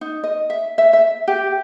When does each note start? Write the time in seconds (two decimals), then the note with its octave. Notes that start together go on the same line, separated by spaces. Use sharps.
0.01 D#4
0.24 D#5
0.50 E5
0.78 E5
0.93 E5
1.28 G4